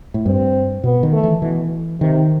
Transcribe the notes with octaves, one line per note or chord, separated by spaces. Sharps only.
A2
G2 C4
B2 B3
D#3
A3
E3
B2 E3
C3 D#3